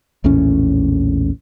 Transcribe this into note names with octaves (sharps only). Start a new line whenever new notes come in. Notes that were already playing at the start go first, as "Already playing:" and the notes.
A#1 E2 A2 C#4